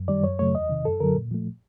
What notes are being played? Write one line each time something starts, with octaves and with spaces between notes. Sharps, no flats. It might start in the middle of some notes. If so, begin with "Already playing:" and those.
Already playing: F#2
D#3 G3 D5
F#2 C#5
C#3 F#3 A3 C#5
E2 D#5
C3 D#3
F#2 A4
D3 F#3 A#4
A#2
F3 A3